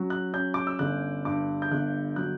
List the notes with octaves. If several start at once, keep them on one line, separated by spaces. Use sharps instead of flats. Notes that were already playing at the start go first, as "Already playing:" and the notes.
Already playing: F#3 C#4
F#6
C#4 G6
D6
E6
G1 F#6
G2 D6
G6
G1 F#6
F#3 F#6